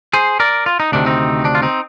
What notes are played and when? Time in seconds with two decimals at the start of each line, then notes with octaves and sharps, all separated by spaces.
0.13 G#4 C5
0.40 A#4 D5
0.66 F4
0.80 D#4
0.92 D2 C3 D#3 D4
1.06 C4 D#4
1.45 D4
1.55 F4
1.62 C4 D#4